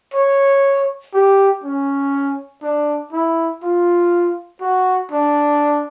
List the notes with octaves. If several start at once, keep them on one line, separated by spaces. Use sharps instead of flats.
C#5
G4
C#4
D4
E4
F4
F#4
D4